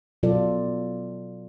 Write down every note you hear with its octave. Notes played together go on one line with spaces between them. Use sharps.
B2 F#3 F4 A4 D5